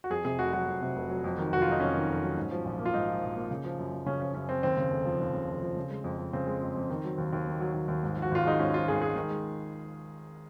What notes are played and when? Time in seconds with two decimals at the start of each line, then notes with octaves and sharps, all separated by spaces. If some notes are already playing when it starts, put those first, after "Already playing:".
0.04 F#4
0.10 F2 G#4
0.24 C3 G#4
0.39 F1 F#4
0.53 F#3 F#4
0.68 F2
0.81 C3
0.96 F1
1.10 F#3
1.24 F2
1.38 D#3
1.52 F1 F#4
1.62 F#3 F4
1.72 D#4
1.80 F2 C#4
1.95 D#3
2.08 F1
2.23 F#3
2.37 G#2
2.51 F3
2.65 A#1
2.79 A#3
2.86 F4
2.94 G#2 D#4
3.08 F3
3.22 A#1
3.36 A#3
3.51 C#3
3.64 F3
3.79 F#2
3.92 F#2
4.06 C#3 C#4
4.20 F3 C#4
4.34 F#2 C#4
4.49 F#2 C4
4.63 D#2 C4
4.77 C#3
4.91 F1
5.06 F3
5.20 D#2
5.34 C#3
5.48 F1
5.62 F3
5.77 C#3
5.90 G#3
6.04 F2
6.19 F2
6.33 C#3 C4
6.47 G#3
6.62 F2
6.76 F2
6.89 D#3
7.04 F#3
7.18 D#2
7.33 D#2
7.47 D#3
7.61 F#3
7.74 D#2
7.88 D#2
8.03 G#2
8.17 F3
8.22 F#4
8.32 G#1 F4
8.46 G#3 D#4
8.59 G#2 C#4
8.73 F3 F4
8.88 G#1 G#4
9.02 G#3 G#4
9.16 D#3
9.30 G#3